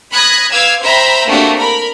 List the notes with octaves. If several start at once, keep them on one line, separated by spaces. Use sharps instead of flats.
B5 D#6 F#6 G#6 A#6
B4 F5 D6 E6 G#6
C5 E5 G5 A#5 B5
A3 A#3 C4 D4 F#4 G4
A#4 B5